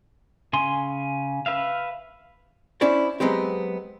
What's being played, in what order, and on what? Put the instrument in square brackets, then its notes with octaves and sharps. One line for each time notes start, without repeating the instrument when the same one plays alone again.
[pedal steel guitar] C#3 G#5 C6
B4 E5 F5
[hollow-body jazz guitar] C#4 D4 E4 C5 D5
F#3 G#3 B3 C4 G4